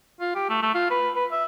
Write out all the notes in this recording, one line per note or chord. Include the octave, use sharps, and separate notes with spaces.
F4
G4
A3
A3
F4
B4
B4
E5